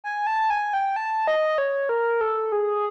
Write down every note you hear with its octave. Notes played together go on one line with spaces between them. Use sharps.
G#5
A5
G#5
G5
A5
D#5
C#5
A#4
A4
G#4